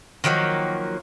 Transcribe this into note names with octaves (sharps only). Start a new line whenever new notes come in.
D#3 F3 F#3 A#3